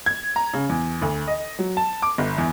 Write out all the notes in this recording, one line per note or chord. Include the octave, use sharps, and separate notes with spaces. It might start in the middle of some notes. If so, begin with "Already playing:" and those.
G#6
A#5
C#3
E2
D2
D#5
F#3
A5
D6
G1
E2